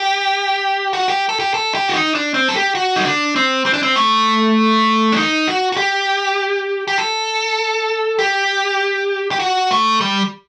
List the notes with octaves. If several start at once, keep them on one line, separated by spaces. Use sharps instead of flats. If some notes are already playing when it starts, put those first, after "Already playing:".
Already playing: G4
F#4
G4
A4
G4
A4
G4
F#4
D#4
D4
C4
A4
G4
F#4
D#4
D4
C4
C4
D4
C4
A3
D4
D#4
F#4
F#4
G4
G4
A4
G4
G4
F#4
A3
G3